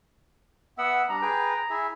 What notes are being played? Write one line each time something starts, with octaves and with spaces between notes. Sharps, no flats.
B3 E5 F#5 E6
G3 D4 A#5
G#4 B4 G5
E4 G#4 E5